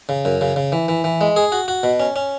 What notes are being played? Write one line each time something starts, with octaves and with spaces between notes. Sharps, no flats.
C#3
F#2
C#3
C#3
E3
E3
E3
G#3
G#4
F#4
F#4
B2
C#4
C#4